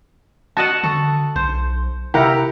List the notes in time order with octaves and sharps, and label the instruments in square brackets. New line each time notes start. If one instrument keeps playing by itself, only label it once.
[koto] F#4 D#5 F#5 [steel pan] A5
[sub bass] D3 [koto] A4 [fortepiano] C#6
[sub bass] B1 [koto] C5
[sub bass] C3 [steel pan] E4 A#4 A#5 [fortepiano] G4 F#5